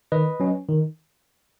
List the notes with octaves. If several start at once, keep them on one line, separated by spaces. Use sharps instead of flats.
D#3 B4 D#5
F#3 C#4
D#3